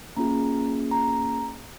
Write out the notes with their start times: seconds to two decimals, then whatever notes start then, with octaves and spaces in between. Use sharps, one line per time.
0.17 A#3 C#4 F4 G#4 A#5
0.91 A#5